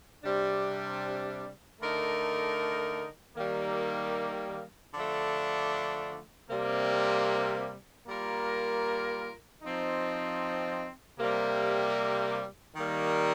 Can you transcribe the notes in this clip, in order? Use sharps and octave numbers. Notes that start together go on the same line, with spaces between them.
C3 G3 D4
D3 A3 D#4 A#4
D#3 G3 A#3
D3 F3 A3 D4
C3 G3 A#3
G3 A#3 F4 A#4
F3 C4 D#4
C3 G3 A#3
D#3 G3 A#3